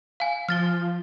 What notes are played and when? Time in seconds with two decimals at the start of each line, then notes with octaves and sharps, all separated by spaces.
0.20 F5 G#5
0.49 F3 F6 A6 G7